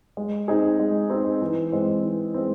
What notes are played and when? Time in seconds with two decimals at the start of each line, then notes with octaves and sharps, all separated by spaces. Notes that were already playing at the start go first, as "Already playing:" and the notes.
0.17 G#3
0.48 C4 D#4 G#4
0.80 G#3
1.10 C4 D#4 G#4
1.42 E3
1.72 G#3 C4
2.03 E3
2.34 G#3 C4